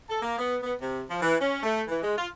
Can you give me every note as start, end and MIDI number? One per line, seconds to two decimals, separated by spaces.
0.10 0.20 69
0.22 0.38 58
0.39 0.56 59
0.63 0.75 59
0.82 1.02 48
1.10 1.20 53
1.22 1.36 52
1.41 1.60 61
1.63 1.84 57
1.88 2.01 52
2.03 2.18 56
2.18 2.28 65